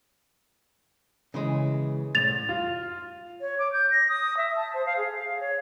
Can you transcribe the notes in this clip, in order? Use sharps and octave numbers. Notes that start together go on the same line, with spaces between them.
C#3 E3 G#3
C2 A2 A6 F7
F4
C#5
D6
G6
A#6
D#6
E5
A5
C5
F5
G#4
F5
C#5